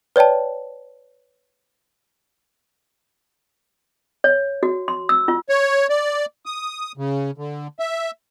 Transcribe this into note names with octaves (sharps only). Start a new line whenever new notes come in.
B4 C#5 D5 G5 A5
C#5
F#4
C6
E6
F4
C#5
D5
D#6
C#3
D3
E5